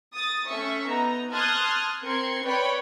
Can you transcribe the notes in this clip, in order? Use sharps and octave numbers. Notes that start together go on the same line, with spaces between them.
D#6 A6
A3 C#4 E5 C#6
B3 D#4 A#5
A5 C6 D#6 F6 F#6 G#6
C4 A#4 C6 G#6 C#7
B4 C#5 D5 G5 B5